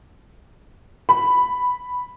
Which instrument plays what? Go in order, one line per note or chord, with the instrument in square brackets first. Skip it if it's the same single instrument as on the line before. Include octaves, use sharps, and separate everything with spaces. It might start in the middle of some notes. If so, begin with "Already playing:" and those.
[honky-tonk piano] B5